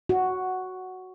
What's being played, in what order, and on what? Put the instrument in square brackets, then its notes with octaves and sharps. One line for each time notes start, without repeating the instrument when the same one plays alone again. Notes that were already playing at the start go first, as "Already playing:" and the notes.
[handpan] F#4